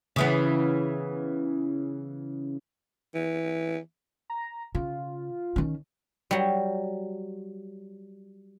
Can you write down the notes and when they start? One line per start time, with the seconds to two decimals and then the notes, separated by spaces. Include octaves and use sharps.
0.16 C#3 E3 B3
3.15 E3
4.30 A#5
4.75 C#3 F4
5.56 D#3 C#4
6.31 F#3 G3